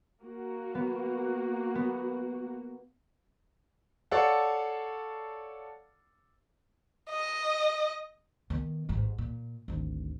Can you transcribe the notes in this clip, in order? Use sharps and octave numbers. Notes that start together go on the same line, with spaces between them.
A#3 F#4
B3
B3
A4 C#5 D5 F5 F#5 A5
D#5
D#3 B3
A1 G#2
A#2
G#1 D2